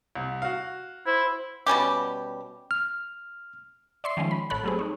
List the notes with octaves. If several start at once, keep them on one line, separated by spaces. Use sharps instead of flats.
C2
F#4 F5
E4 C5
B2 G3 C#4 G4
F6
D5 E5 C6 C#6 C7
D#3 F3 G#3 C#4
B5
A1 A4 C#5 B5 F#6
F#3 G3 A3 C4 G#4
D#4 C#5